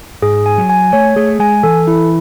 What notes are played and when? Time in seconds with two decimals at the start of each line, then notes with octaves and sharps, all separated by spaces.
0.22 G#2 G#4
0.46 G#5
0.58 F#3
0.70 G#5
0.93 A3 C#5
1.16 A3 G#4
1.40 G#3 G#5
1.63 E3 A4
1.87 E4